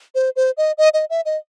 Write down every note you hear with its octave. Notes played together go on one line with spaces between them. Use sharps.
C5
C5
D#5
D#5
D#5
E5
D#5